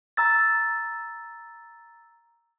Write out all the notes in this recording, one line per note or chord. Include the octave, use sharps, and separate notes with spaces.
A#5 E6 A6